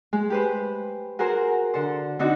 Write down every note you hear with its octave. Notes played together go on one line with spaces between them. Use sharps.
G#3
G4 B4 C5
F#4 G#4 A#4 C5
D3 A4 C5
D3 C4 D4 D#4 F#4